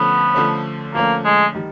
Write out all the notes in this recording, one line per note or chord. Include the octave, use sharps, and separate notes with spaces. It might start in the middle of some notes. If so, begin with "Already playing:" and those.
Already playing: D3 F3 A3 B3 C#4
D3 F3 A3 C#4
D3 F3 A3 A#3 C#4
G#3
D#3 G3